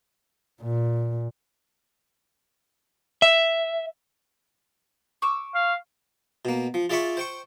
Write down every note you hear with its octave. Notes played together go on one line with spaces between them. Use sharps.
A#2
E5
C#6 D6 E6
F5
B2 A#3
F3
F4 G#4 D5 E5 B5 C#6
C5 G5 C#6